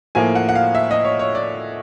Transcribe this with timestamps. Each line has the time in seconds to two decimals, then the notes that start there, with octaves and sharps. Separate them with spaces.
0.15 A2 F3 A#3 G#5
0.35 F#5
0.49 F#5
0.55 F5
0.75 E5
0.91 D#5
1.05 C#5
1.19 C#5
1.35 D5